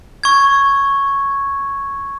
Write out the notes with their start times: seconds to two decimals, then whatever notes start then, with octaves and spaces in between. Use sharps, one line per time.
0.23 C#6 G#6